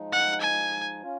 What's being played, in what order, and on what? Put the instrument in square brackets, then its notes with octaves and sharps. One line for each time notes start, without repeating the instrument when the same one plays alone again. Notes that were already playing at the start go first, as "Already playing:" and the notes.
Already playing: [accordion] F3 G#3 D#4
[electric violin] F#5
G#5
[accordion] C#4 F4